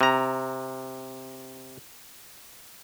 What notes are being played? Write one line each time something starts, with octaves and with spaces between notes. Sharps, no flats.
C3 A#5